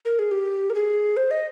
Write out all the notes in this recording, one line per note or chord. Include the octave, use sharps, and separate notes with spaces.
A#4
G#4
G4
A#4
G#4
C5
D#5